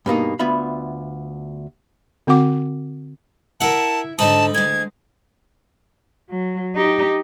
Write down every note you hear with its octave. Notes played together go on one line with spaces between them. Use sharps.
G2 B2 A#3 D#4
D2 B3 F4 E5 B5
D3 C4 F#4 F#5 D6
E4 A#4 E5 F#5 A5
G#2 D3 D#4 A5 B5 D#6
D2 G#3 G#6
F#3
D#4 G4